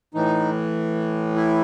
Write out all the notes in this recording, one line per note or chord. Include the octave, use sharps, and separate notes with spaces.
A2 E3 D#4
E4